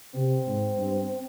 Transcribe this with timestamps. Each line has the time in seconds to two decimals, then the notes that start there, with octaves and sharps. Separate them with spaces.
0.15 C3 C4
0.47 G#2
0.78 G2